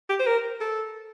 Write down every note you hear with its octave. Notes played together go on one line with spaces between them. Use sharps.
G4
C5
A#4
A4